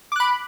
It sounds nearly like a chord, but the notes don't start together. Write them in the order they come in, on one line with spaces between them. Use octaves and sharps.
D6 F#6 B5